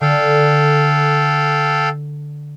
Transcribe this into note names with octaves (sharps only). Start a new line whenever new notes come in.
D3 A4 F5 G5